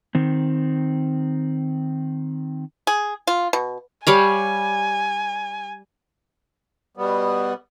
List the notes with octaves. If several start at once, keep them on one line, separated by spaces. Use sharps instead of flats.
D#3 C4
G#4
F4
B2
G3 C#5 F5 G#5
B2 G3 B3